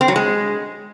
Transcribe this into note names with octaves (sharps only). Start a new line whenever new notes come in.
C4
F#3
G#3